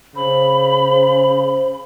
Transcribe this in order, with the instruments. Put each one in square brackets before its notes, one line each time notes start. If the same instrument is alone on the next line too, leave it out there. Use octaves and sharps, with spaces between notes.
[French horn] C#3 [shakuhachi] C5 [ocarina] B5